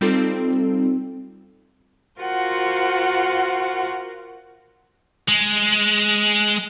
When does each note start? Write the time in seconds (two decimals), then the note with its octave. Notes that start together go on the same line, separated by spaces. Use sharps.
0.01 G3 C4 D#4 F4 A4
2.21 F4 F#4 A#4 C5 F#5
5.28 G#3